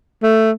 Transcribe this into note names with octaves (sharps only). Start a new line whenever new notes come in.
A3